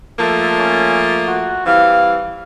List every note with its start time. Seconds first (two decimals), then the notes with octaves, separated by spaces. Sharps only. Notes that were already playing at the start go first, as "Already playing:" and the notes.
0.19 F3 A3 A#3 A4
0.59 C#4
1.27 F#4
1.66 E3 G3 C4 F5